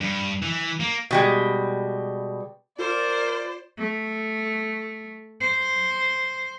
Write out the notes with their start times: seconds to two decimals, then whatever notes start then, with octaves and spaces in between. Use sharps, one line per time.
0.01 G2
0.42 E3
0.80 A#3
1.11 B2 G3 G#3
2.79 F4 A#4 C5 D5
3.78 A3
5.41 C5